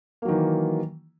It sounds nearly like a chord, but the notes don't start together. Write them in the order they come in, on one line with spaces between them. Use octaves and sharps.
A#3 F#3 D#3 E3